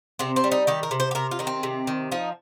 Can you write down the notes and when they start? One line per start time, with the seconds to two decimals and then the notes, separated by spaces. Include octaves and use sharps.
0.19 C3 C4
0.36 C4
0.44 G3
0.52 D#4
0.67 D#3 G4
0.83 A#4
0.91 C3
1.00 C5
1.11 G4
1.15 C3 A#4
1.31 F4
1.39 D#3 D#4
1.47 C4
1.63 C3
1.87 D#3
2.12 F3 D#4